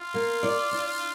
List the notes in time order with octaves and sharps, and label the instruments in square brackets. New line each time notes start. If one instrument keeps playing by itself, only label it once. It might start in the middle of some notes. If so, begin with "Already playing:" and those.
Already playing: [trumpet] F4
[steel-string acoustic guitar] A#3
D5
D4